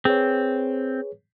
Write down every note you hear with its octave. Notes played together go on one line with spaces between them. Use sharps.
C4 G#4 B4 C#5